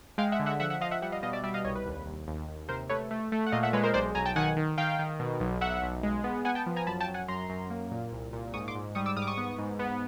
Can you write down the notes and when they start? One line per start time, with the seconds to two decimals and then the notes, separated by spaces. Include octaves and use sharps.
0.18 G#3 F5 G5
0.32 E5 F#5
0.40 D3
0.46 E5 F#5
0.60 F3 E5 F#5
0.70 E5 F#5
0.81 F3 D#5 F5
0.91 E5 F#5
1.02 G3 E5 F#5
1.12 D#5 F5
1.23 B2 D#5 F5
1.33 D5 E5
1.43 G3 D5 E5
1.54 D#5 F5
1.64 C2 C#5 D#5
1.76 B4
1.86 D#2
2.06 D#2
2.28 D#2
2.48 D#2
2.69 C3 A#4 C5
2.90 A3 B4 C#5
3.11 A3
3.32 A3
3.47 F#5
3.52 A#2 D#5 F5
3.63 E5 F#5
3.73 G#3 B4 C#5
3.83 A#4 C5
3.94 B1 C5 D5
4.15 B1 G#5 A#5
4.25 G5 A5
4.36 D#3 F#5 G#5
4.56 D#3
4.78 D#3 F5 G5
4.99 D#3
5.20 B2
5.40 B1
5.61 B1 E5 F#5
5.82 B1
6.03 G#3
6.24 B3
6.45 B3 F#5 G#5
6.55 G5 A5
6.66 F3
6.76 G#5 A#5
6.87 F#2 A5 B5
7.00 G5 A5
7.08 F#2
7.14 F#5 G#5
7.28 F#2 A#5 C6
7.49 F#2
7.70 A#3
7.91 A#2
8.12 C2
8.33 A#2
8.54 G#2 C#6 D#6
8.68 C6 D6
8.75 G#2
8.95 G3 C#6 D#6
9.06 D6 E6
9.16 G#2 D#6 F6
9.22 D6
9.27 C#6 D#6
9.38 B3
9.58 G#2
9.79 B3